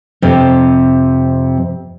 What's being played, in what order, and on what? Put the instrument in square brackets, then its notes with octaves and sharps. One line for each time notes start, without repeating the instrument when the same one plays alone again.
[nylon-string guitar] F2 C3